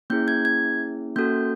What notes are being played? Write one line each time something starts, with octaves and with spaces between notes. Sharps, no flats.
A#3 C#4 E4 G#4 G6
G#6
G#6
A#3 C#4 F#4 A4 G6